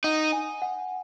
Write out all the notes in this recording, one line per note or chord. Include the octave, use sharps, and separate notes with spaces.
D#4 F#5
G#5
F#5